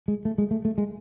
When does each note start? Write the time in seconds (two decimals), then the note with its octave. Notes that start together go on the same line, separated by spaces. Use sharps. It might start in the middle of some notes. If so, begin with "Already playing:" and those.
0.08 G#3
0.25 A3
0.38 G#3
0.51 A3
0.65 A3
0.78 G#3